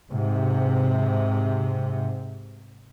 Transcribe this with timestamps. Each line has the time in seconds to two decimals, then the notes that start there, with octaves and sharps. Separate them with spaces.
0.11 G#2 C3